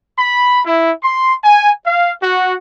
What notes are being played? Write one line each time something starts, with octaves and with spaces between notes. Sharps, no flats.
B5
E4
C6
G#5
F5
F#4